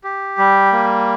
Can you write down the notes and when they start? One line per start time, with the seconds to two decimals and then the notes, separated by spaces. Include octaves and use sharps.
0.04 G4
0.38 G3
0.72 A#3